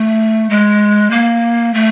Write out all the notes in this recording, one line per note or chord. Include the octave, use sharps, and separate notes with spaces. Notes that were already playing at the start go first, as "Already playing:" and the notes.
Already playing: A3
G#3
A#3
A3